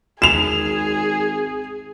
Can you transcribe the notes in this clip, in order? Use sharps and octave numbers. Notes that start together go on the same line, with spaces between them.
G#1 G#4 E7 F7